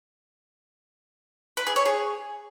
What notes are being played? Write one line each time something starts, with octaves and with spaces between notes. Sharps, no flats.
B4
G#4
C#5
G#4